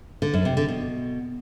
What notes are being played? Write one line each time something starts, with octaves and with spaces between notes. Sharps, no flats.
D3
F#2
C3
D3
B2